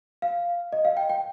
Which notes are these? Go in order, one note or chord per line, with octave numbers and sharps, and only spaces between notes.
F5
D#5
F5
G5
G5